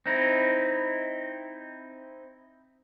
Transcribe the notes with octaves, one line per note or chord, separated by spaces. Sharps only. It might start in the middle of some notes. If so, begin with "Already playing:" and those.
C4 D#4 E4